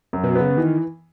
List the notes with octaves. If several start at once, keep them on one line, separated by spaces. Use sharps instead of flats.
F#2
B2
B3
C#3
D#3 E3